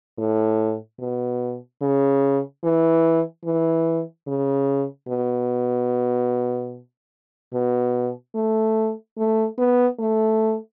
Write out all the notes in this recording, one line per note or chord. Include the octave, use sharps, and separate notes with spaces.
A2
B2
C#3
E3
E3
C#3
B2
B2
A3
A3
B3
A3